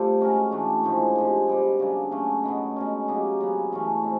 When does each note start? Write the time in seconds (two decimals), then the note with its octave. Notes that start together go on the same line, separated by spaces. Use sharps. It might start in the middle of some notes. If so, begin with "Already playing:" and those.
Already playing: G3 A3 C4 F4
0.20 G#3 C#4 F#4 A#4
0.51 E3 A3 D4 F#4
0.84 A2 F3 G#3
1.16 C3 F3 G#3
1.48 B2 G3 C4
1.79 C#3 F#3 A#3 D4
2.11 F#3 A3 C#4
2.43 B2 F#3 B3 D#4
2.76 B2 G#3 C#4
3.08 F#3 A#3 D#4 G4
3.41 C#3 F#3 B3
3.72 E3 A3 C#4
4.04 G#3 C4